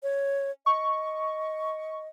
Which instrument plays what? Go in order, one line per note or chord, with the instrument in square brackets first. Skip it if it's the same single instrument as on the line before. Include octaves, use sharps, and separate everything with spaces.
[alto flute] C#5
[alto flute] D#5 [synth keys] C#6